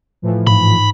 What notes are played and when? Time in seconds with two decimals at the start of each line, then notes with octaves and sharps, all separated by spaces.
0.22 A2 E3 F3
0.47 G#2 B5